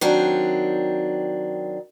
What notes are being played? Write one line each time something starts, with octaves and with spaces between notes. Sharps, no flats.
D#3 F#3 C4 D4